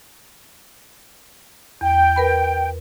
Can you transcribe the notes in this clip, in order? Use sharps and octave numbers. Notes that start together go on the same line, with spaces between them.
E2 G5
A#4 B4 B5